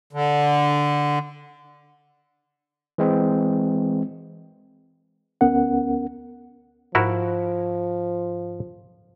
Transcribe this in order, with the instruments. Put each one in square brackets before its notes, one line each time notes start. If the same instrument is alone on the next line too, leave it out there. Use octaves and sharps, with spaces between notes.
[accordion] D3
[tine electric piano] E3 G#3 C4
[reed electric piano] D2 B3 C#4 A#4 F#5
[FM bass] G#2 [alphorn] F3 [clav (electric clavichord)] E4 F#4 A#4